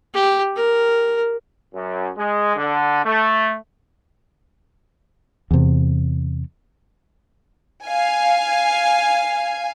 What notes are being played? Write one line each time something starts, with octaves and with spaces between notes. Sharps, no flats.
G4
A#4
F#2
G#3
D3
A3
E2 C3
F5 G#5